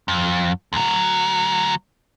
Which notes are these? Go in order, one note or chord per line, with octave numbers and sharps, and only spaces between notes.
F2
D2 F#3